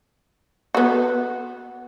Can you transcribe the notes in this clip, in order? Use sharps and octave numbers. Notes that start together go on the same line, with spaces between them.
B3 F#4